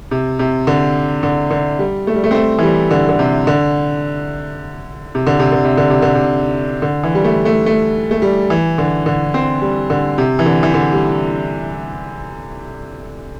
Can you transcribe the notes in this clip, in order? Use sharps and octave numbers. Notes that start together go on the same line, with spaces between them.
C3
C3
D3
D3
D3
G3
A3
G3
A3
C4
A3
E3
G3
D3
D3
C3
D3
C3
D3
C3
D3
C3
D3
C3
D3
C3
D3
E3
G3
A3
A3
A3
A3
G3
E3
D3
D3
C4
G3
D3
C3
E3
D3
E3
D3
G3